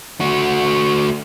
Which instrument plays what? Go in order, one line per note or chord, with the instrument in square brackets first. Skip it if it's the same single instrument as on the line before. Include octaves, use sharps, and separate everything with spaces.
[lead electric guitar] A3 F#4